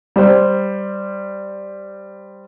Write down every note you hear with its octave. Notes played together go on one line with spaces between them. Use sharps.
G3 C5